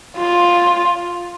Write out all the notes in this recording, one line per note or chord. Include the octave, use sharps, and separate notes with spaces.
F4